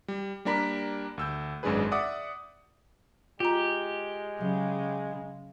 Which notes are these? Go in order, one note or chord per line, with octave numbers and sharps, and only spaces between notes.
G3
G3 A#3 D4 A#4 B5 B6
D2 E6 G6
G#1 F#2 G#3 D4 G#4 B4
D5 E5 F#5 D6 D#6
G#3 F4 G4 A#5
C#3 F#3